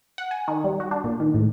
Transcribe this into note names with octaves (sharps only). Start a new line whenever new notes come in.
F#5
G#5
D#3
G3
F#4
D4
A#2
D#3
A2